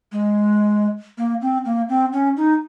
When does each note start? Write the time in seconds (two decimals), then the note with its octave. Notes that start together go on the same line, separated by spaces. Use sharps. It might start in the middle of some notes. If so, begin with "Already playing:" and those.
0.12 G#3
1.18 A#3
1.42 C4
1.65 A#3
1.89 C4
2.13 C#4
2.37 D#4